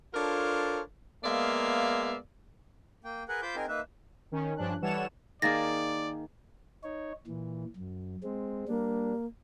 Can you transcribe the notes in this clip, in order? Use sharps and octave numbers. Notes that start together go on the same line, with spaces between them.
D4 F4 A4 A#4 C5 C#5
G#3 A#3 B3 D5 E5 F5
A#3 G5
G#4 A#4 B4 F#5
F4 C5 B5 D6 G6
C4 D#4 G#4 A#4
A#3 D#4 B4 E5
D#3 C#4
G2 F3 C#4 D4 F#6
E3 G3 A4 C#5 F#5 E7
D#3 A#3 G#4 D5 A6 A#6
D#4 C#5
A#2 E3
F#2
G#3 C4
G3 A#3 D4